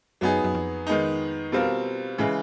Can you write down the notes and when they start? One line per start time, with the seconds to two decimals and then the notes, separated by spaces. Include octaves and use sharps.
0.21 F#2 F#3 B3 D#4 G#4
0.44 F#2
0.54 F2
0.87 D#3 G#3 B3 D#4
1.52 B2 G3 C4 F4 A#4
2.18 A2 C#3 E3 G#3